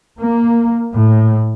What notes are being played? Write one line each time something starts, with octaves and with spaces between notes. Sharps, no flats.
A#3
A2